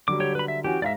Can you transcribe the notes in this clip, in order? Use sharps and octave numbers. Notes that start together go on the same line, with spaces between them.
D3 F#3 G3 D6
G4 C#5
B4 B5
E5
E3 C#4 F#4 G4
G#2 D5 E5 F5 A#6